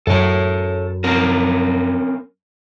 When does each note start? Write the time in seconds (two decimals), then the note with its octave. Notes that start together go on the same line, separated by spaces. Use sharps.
0.07 F#2 A4 C#5
1.04 C4 C#4 A#4